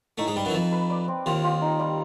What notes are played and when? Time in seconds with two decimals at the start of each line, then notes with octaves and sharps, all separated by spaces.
0.18 A2 A3 D#4
0.27 G#2 G#3
0.36 G2 G3 B4
0.45 F#2 F#3
0.50 E3
0.54 F2 F3 B4
0.72 B4
0.90 D5
1.08 C4
1.26 D#2 D#3 F4
1.44 F4
1.62 D#4
1.80 G3